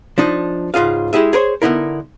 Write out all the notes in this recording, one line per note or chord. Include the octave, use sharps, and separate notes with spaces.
F3 D4 D#4
C#2 G#2 F4 G#4 F5
G#3 E4 G4 G#4 E5
G#4 A#4 C5 C#5
D3 B3 D#4 E4 A#4